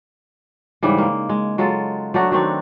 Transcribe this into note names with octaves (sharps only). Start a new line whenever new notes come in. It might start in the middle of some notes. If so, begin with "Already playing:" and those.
G#2 C#3 E3 G3
G#3 A#3
G#3
F#3 G#3 F4 A4
F#3 A3 D4 F#4
D#3 F#3 C4 D4